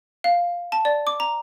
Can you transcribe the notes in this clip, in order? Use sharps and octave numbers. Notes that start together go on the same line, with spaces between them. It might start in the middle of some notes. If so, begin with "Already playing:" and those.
F5
A5
D5
D6
A#5